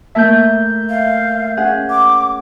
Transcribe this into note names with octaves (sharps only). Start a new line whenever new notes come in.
A3 A#3 E5 A5 G6
F5
C#4 G#4 F#5
D6